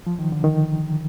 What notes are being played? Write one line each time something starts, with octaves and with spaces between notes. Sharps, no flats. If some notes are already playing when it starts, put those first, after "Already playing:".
F3
D#3
D3
D#3